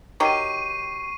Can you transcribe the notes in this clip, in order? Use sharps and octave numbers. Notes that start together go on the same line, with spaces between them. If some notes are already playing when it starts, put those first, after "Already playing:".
D#3 F#3 G4 C#6 C7 D#7